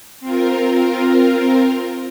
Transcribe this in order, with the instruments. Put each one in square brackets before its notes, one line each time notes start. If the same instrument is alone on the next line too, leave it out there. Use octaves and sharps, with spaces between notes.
[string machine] C4 F4 A#4